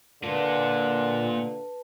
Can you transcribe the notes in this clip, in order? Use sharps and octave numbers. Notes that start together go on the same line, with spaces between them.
D3 A#3 F4 B4 A5